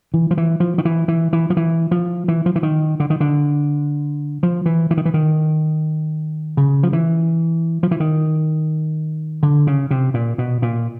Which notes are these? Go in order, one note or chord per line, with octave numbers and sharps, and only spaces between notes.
E3
F3
E3
F3
D#3
E3
E3
E3
F3
E3
F3
E3
F3
E3
D#3
D3
D#3
D3
F3
E3
E3
D#3
E3
D#3
C#3
F3
E3
F3
E3
D#3
D3
C#3
C3
A#2
B2
A#2